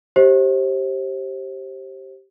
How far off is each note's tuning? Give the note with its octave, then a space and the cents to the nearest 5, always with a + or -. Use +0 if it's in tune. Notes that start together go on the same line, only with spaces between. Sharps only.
G4 -15 C5 +25 D#5 +40